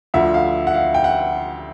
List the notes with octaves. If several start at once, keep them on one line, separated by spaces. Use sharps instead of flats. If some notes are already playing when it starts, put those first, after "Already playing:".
D2 D3 F3 E5
F5
F#5
F5
G5
F#5